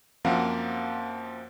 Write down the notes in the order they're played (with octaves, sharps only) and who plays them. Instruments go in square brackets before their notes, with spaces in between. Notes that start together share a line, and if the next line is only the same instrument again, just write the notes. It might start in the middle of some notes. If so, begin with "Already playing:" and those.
[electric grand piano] F#2 F3 A#3 C4 F5 F#5